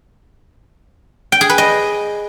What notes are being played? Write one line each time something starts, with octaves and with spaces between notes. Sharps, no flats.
G5
G#4
B4
D#5